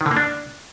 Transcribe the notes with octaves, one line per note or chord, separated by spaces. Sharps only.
D#3
D3
A#3
D4